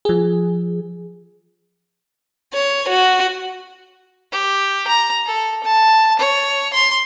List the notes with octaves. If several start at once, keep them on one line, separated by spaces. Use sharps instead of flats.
F3 G#4
C#5
F#4
G4
A#5
A4
A5
C#5
C6